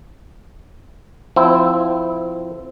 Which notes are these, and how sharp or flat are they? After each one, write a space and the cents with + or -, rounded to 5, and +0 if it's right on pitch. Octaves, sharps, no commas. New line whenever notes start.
F3 +0 C4 -20 E4 +0